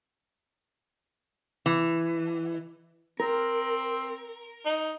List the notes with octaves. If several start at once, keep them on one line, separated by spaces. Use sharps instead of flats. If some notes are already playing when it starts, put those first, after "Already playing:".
E3
C4 A#4
D#4